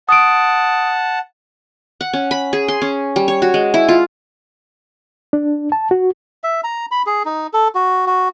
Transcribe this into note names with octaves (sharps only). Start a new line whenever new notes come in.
F#5 A5 D#6 D7
F#5
C#4
B5
G#4
C6
C#4
G3
C#5
F#4
G#3
E4
F4
D4
A5
F#4
E5
A#5
B5
G#4
D#4
A4
F#4
F#4